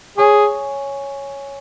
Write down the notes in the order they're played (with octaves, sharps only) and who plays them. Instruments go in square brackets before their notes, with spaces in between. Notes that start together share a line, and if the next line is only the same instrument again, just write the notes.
[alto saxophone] G#4 [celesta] C#5 G#5 C#6